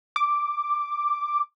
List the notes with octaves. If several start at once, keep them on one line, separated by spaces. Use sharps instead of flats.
D6